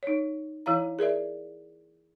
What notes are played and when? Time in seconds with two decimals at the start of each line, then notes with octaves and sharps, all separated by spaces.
0.03 D#4 C#5
0.66 E3 E4 C#5 F5 A#5
0.99 G#4 A#4 D5 E5